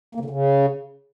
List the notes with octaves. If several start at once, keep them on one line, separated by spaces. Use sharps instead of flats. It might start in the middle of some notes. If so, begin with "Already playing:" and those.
A#3
C#3
D3
C#3